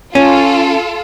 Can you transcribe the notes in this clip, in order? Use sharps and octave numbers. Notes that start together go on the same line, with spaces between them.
C#4 F4 A4